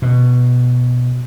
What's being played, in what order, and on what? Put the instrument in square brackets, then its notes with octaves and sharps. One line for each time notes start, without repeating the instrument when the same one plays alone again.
[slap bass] B2